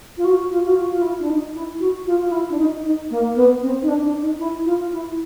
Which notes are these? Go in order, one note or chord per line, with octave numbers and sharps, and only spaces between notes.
F4
F#4
F4
F#4
F4
F4
E4
D4
D#4
E4
F#4
F4
F4
E4
D4
D#4
D#4
A#3
B3
C4
D#4
D4
D4
D#4
E4
F4
E4